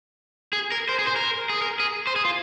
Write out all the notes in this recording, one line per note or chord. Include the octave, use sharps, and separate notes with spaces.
G#4
A#4
C5
G#4
C5
A#4
G#4
A#4
G#4
C5
G#4
F4